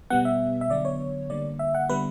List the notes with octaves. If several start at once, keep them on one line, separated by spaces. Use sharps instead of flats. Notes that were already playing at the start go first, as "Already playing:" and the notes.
B2 G3 B3 F#5
E5
E5
D3 F#3 B3 D5
C#5
D3 G3 A#3 D5
E5
F#5
D3 G3 B3 B4